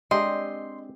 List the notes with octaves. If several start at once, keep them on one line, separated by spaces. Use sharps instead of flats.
G#3 C4 D4 G4 D#5 C6